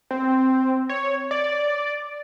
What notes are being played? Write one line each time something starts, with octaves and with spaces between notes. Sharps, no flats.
C4
C#5
D5